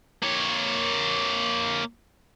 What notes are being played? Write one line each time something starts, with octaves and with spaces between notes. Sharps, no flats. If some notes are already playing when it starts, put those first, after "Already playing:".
A#3 C#5